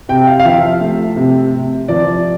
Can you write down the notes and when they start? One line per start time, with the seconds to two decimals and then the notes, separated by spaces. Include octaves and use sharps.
0.09 C3 G5
0.27 F5
0.40 F5
0.45 F3 E5
0.81 A3
1.16 C3
1.53 C3
1.88 F3 D5